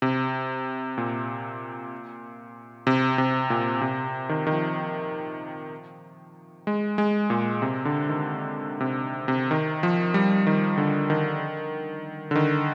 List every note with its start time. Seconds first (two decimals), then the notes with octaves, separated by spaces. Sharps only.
0.02 C3
0.98 A#2
2.87 C3
3.18 C3
3.50 A#2
3.81 C3
4.29 D#3
4.47 D#3
4.52 F3
6.67 G#3
6.98 G#3
7.30 A#2
7.62 C3
7.85 D3
8.09 D#3
8.80 C3
9.28 C3
9.51 D#3
9.83 F3
10.14 G3
10.47 D#3
10.78 D3
11.10 D#3
12.31 D3
12.35 D#3